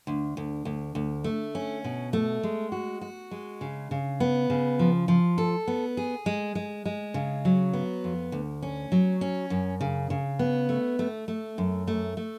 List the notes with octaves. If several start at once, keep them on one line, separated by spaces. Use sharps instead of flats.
D2
D2
D2
D2
A3
C#4
B2
A3
G#3
F#4
F#4
G#3
C#3
C#3
B3
C#3
F3
F3
A4
B3
G#4
G#3
G#3
G#3
C#3
F#3
B3
F2
D2
C#4
F#3
C#4
F#2
C#3
C#3
B3
A3
A3
A3
F#2
A3
A3